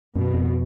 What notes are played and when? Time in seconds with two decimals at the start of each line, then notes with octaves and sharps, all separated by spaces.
0.16 F#2 B2
0.34 F2